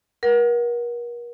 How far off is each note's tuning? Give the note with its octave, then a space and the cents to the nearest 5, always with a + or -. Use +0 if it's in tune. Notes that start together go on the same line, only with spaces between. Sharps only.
A#4 +40 F#5 +0